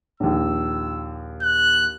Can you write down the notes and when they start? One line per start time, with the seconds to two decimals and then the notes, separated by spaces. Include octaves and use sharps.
0.20 A#1 D#2 E6
1.42 F#6